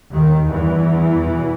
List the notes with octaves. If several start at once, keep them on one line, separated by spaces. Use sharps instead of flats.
D#2 D#3
E2 G2 E3
E2 B2